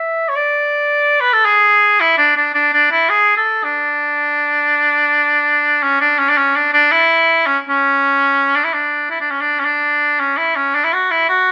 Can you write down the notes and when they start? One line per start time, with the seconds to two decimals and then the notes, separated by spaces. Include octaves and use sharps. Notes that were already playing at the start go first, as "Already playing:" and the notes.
Already playing: E5
0.29 C#5
0.36 D5
1.20 B4
1.33 A4
1.45 G#4
2.00 E4
2.18 D4
2.37 D4
2.54 D4
2.73 D4
2.91 E4
3.09 G#4
3.37 A4
3.64 D4
5.82 C#4
6.00 D4
6.19 C#4
6.29 D4
6.37 C#4
6.56 D4
6.73 D4
6.92 E4
7.46 C#4
7.69 C#4
8.56 D4
8.64 E4
8.73 D4
9.10 E4
9.21 D4
9.31 C#4
9.41 D4
9.59 C#4
9.65 D4
10.20 C#4
10.38 E4
10.56 C#4
10.75 D4
10.84 E4
10.93 F#4
11.11 E4
11.29 F#4